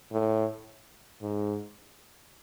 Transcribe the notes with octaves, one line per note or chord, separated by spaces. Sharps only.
A2
G#2